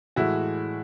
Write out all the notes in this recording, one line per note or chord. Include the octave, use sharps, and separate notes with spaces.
A2 E3 G#3 E4 F#4